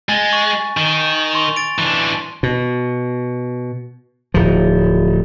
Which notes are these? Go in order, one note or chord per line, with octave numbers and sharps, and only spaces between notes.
G#3 G#5 A6
C#6
D#3
C6 C#6 F7
A6 D7
E3 D4
B2
D1 F3